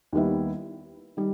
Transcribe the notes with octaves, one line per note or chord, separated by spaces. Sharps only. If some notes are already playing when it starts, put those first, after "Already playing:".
D#2 D#3 G3 B3 E4
D#3 G3